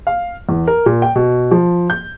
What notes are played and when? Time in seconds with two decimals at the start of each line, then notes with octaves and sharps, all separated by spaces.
0.07 F5
0.49 E2
0.67 A#4
0.86 A#2
1.02 G5
1.15 B2
1.51 F3
1.90 G6